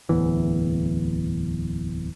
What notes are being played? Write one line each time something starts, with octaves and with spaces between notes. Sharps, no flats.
D1 E2 E3